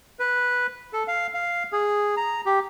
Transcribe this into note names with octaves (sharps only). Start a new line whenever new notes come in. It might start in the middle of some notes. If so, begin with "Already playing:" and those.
B4
A4
F5
F5
G#4
A#5
G4